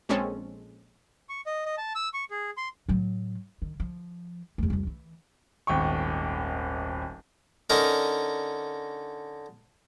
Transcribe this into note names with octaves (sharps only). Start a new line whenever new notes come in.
A#1 G#3 C4 C#4 A4
C#6
D#5
D#5
A5
E6
C#6
G#4
C6
A2 F#3
D#3
F3
E2 A3
C2 F2
E3
D#1 G#1 G5 C#6
D3 C#4 D#4 A#4